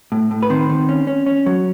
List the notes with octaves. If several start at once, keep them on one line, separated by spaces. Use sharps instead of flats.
A2
A2
B4
D#3 C4 C5
D#3
C#4
C#4
C#4
F#3